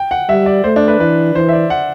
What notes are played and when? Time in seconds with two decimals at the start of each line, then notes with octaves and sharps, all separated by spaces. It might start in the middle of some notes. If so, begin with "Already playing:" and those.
Already playing: G5
0.11 F#5
0.29 G3 E5
0.46 D5
0.64 A3 C5
0.76 D4
0.88 B4
0.99 E3 B4
1.35 E3 C5
1.49 E5
1.53 D5
1.70 F#5